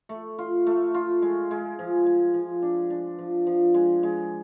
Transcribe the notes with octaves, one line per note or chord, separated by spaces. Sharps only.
A3
F4
A3
F4
G#3
G#3
F3
G#3
F3
D4
D4
F3
F3
G#3
G#3